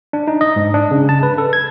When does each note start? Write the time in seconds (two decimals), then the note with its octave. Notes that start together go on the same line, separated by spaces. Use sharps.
0.13 D4
0.28 D#4
0.41 D#5
0.56 G#2
0.74 D4
0.91 C#3
1.09 A5
1.23 B4
1.38 A4
1.53 G#6